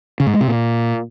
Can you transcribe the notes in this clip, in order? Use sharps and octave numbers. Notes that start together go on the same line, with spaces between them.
C#3
G#2
G#3
C3
A#2